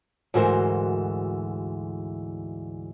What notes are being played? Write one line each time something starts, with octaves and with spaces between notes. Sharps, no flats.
D2 G#2 E3 F#4 A#4 C5